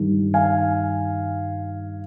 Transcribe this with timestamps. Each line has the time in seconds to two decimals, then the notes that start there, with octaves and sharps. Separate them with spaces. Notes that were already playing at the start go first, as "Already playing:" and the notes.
Already playing: G2 D#3 G3
0.34 F5 G#5